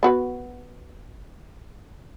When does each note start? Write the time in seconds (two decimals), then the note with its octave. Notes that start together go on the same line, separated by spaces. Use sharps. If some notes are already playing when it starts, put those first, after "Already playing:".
0.03 B3 F#4 B4